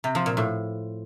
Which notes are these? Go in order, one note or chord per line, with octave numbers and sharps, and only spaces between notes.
C3
F3
A#2
A2